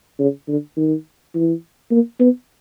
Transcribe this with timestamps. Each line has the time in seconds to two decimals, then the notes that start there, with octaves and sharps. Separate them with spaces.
0.19 C#3
0.48 D3
0.77 D#3
1.34 E3
1.91 A#3
2.20 B3